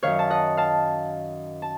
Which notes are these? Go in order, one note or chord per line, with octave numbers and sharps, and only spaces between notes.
F#2 D#3 C#5 F5
A5
D#5 F#5
F5 A5
A5